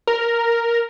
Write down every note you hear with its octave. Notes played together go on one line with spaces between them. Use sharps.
A#4